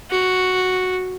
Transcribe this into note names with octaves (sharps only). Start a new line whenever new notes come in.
F#4